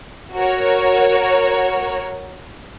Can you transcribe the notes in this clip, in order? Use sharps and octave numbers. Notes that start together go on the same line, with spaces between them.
F#4 A#4 C#5